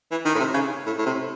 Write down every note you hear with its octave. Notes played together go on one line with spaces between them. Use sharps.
E3
D#3
A2
C3
C#3
A2
A2
C3